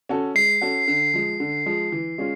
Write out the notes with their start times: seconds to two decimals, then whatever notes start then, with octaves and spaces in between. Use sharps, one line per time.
0.09 C#4 F#4 A4
0.35 G#3 C7
0.61 C#4 F#4 A4
0.88 D3
1.14 F3 G#3
1.40 D3
1.66 F3 G#3
1.92 E3
2.18 G#3 C#4 F4